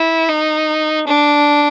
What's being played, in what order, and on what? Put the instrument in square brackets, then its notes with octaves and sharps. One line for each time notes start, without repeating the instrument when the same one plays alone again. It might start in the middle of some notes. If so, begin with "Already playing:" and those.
Already playing: [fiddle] E4
D#4
D4